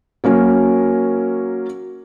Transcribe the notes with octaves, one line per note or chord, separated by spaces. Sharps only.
F#3 A#3 C#4 A#4